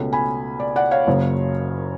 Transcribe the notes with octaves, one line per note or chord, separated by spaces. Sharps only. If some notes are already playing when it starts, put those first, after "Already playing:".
Already playing: C#2 B2 A3 C#4
G#5 B5
D5
D5 F#5
C#5 F5
F#1 F#2 C#3